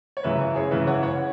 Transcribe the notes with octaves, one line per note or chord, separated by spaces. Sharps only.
C#5
F#2 C#3 E3 B4 E5
G#4 C#5
F#2 C#3 E3 B4 E5
C#5 F#5
C#5 F#5